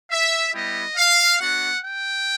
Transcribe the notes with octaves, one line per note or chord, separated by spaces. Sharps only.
E5
G3 B3 E4 G4 D#5
F5
B3 D4 F#4 F#5
G5